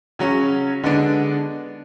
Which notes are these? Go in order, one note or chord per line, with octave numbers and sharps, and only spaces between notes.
C#3 F#3 C#4
D3 G#3 B3 D4